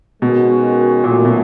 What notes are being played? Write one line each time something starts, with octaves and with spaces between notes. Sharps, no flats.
B2 D#3 G#3 C#4 F#4 A#4
F#2 A#2 D#3 F#3 A3
B2